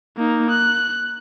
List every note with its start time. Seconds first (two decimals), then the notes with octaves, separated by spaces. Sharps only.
0.17 A#3 D#4
0.50 F#6